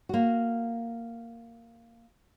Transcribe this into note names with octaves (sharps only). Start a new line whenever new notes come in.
A#3 F#4